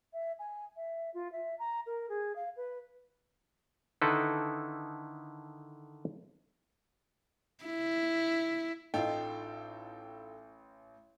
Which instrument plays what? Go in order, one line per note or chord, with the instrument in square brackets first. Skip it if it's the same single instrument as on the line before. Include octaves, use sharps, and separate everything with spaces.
[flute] E5
G#5
E5
F4
E5
A#5
A#4
G#4
F5
B4
[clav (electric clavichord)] D3 D#3 D#4 E4 A4 B4
[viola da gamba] E4
[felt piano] A1 [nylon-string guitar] D#4 F4 [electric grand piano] A4 F5 G5 [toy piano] D#5